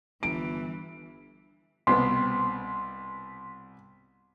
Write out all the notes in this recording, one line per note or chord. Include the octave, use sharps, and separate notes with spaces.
G1 E3 D7
C2 B2 B3 C6 B6